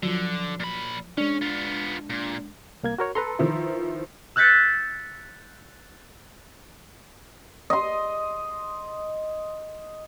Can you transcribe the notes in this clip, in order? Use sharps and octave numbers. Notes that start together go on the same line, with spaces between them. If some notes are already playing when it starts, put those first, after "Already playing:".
D3 F3 F#3
A#2 B5
G#3 C#4 D4
B3 F4
A#2
C2 A#3 G#6
F#4 A#4 C#5
A4 B4 A#5 C6
D#3 F3 E4
E6 F#6 G6 A6 B6 C#7
D#5 C6